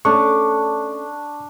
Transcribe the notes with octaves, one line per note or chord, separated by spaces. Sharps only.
A3 C#4 D4 C#6